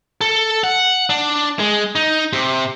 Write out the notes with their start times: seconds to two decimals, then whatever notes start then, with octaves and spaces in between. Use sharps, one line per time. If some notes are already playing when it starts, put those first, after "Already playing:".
0.21 A4
0.64 F#5
1.10 D4
1.59 G#3
1.95 D#4
2.33 C3